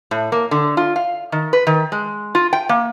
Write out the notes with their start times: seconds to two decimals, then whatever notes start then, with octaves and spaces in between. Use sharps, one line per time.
0.11 A2
0.32 A#3
0.51 D3
0.77 F4
0.96 F5
1.32 D#3
1.53 B4
1.67 D#3
1.92 G#3
2.35 F4
2.53 G5
2.69 A#3